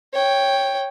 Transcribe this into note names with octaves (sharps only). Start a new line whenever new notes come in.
C#5 G5